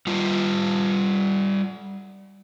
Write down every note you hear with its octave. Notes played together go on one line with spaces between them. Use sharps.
G3 F4